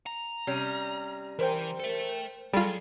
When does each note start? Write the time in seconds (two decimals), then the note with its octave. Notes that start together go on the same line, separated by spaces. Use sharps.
0.06 A#5
0.47 C3 G3 C#4
1.39 E3 A#4 C5 G5
1.80 A4 E5
2.53 F#3 G3 F4 G#4 A4